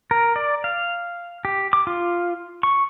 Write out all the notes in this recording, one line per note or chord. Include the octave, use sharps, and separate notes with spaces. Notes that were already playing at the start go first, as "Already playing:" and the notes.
A#4
D5
F5
G4
D6
F4
C#6